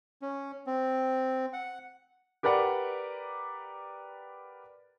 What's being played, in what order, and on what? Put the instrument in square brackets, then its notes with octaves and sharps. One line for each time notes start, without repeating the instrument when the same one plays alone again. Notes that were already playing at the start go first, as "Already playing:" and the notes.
[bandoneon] C#4
C4
F#5
[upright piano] G4 A#4 B4 D5 F#5